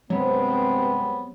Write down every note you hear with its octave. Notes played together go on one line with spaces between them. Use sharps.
G2 C3 F#3 G#3 B3 C4